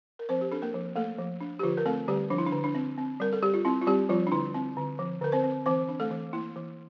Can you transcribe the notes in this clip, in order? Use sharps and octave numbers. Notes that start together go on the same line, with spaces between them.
A#4
F3 C4 C5
G4
D4 A4
A#3 A#4
F3
A3 A#3 A4
F3
D4
G4
D3 F3 F4
A#4
A3 C4 A4
D3 G3 G4
F3 D4
E4
D4
D3
D4
C4
C4
G3 A#4
A4
G3 G4
F4
C4 E4
F4
G3 C4 G4
F3 G3 F4
D4
D3 E4
C4
D3
F3
D3 A#4
C4 C5
C4
E3 C4 C5
D4
A3 A4
E3
A#3 E4
E3